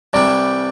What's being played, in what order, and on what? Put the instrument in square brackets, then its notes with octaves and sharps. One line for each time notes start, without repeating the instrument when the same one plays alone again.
[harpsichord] C2 C3 E3 G3 [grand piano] D5